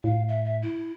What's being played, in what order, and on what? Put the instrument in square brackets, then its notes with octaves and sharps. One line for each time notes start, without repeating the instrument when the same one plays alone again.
[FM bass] A2 [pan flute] F5
[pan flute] E5
E5
E4